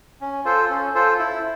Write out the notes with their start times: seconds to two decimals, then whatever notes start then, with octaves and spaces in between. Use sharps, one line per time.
0.21 C#4
0.44 F4 A4 C5
0.69 C#4
0.95 F4 A4 C5
1.19 E4